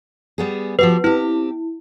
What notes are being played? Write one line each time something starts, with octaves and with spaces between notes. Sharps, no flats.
G3 B3 G#4
F3 F#4 G4 B4
C4 E4 G4